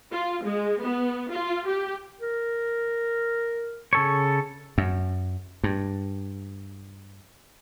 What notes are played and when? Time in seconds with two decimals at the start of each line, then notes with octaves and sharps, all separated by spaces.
0.12 F4
0.44 G#3
0.81 B3
1.31 F4
1.67 G4
2.21 A#4
3.93 C#3 A4 C#5
4.78 F#2
5.64 G2